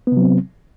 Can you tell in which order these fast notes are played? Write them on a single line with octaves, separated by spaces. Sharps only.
B3 C3 F#3 C4